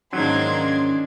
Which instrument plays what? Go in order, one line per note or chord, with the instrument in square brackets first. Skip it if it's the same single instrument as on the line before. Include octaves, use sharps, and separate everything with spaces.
[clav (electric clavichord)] G#2 F#3 [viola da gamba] D#3 A#3 D4 [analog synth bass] C#4 [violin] C6 G#6